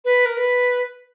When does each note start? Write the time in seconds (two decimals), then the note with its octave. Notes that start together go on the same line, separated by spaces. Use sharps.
0.05 B4
0.26 A#4
0.37 B4